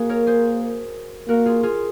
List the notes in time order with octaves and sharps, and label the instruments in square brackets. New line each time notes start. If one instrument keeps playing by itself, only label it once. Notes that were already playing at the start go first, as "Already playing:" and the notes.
Already playing: [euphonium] A#3 [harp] F#4 G#4
[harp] A#4 C#5
G#4 C5
[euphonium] A#3 [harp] F#4 A#4
[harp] F4 G#4
F4 G#4